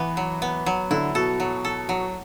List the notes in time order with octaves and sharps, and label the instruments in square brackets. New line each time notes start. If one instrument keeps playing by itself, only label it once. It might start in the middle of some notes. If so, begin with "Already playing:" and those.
Already playing: [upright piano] E3 [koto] B3
[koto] F#3
B3
F#3
[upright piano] D3 [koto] E4
[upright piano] B2 [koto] A4
[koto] F#3
A4
F#3